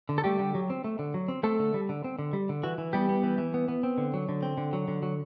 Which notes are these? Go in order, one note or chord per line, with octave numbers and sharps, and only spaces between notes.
D3
A4
G3 A3 G4
D3
F#3
C4
A3
D3
F#3
C4
A3 C4 A4
D3
G3
D3
C4
D3
G3
D3
E3 F#4
E3
G3 B3 G4
B3
E3
E3
B3
B3
C4
D3
F#3
D3
C4
D3
F#3
D3
F#3